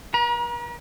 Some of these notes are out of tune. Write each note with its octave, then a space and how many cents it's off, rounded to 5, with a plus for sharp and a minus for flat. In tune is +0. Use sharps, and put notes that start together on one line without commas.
B4 -45 A#5 +35